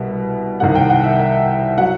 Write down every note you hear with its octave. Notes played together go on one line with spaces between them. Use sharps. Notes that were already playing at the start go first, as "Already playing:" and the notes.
Already playing: C2 B2 G3 E5
C2 C3 D#3 G3 F#5
G5
F#5
E5
E5
F#3 F#5